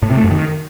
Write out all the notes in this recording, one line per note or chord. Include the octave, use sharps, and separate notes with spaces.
A2
C3
A3
F#2
D#3